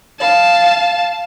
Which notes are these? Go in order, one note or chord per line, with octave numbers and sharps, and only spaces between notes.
F5 A5